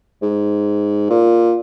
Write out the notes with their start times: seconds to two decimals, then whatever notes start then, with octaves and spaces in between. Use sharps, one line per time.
0.22 G#2
1.10 A#2